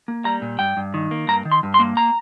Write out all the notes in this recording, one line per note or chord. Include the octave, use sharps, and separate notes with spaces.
A#3
G3 A#5
A#2
G2 G5
G2
D#3
A#3
G2 A#5
D#3
C6
G2
C6
A#3
A#5